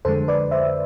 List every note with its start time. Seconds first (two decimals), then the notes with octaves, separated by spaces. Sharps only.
0.05 F2 D3 G#3 A4 C5
0.28 B4 D5
0.51 C5 E5